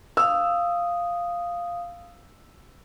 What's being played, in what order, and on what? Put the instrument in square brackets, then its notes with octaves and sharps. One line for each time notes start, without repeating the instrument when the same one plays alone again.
[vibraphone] F5 D#6 [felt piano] E6